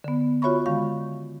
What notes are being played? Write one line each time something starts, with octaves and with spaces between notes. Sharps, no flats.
D3 B3
F4 F#4 C#5 E5 B5 C#6
D3 D#3 G#3 F5 C#6